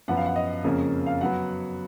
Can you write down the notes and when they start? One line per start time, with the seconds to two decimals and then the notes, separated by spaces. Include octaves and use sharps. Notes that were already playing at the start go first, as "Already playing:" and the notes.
0.08 F#2 F3 B3 F#5
0.17 F5
0.26 F#5
0.36 D#5
0.64 F2 C#3 F3 A#3 C#4
1.06 F5
1.21 F#3 B3 F#5